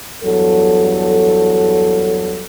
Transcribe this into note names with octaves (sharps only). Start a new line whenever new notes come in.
E2 G2 F#3 A4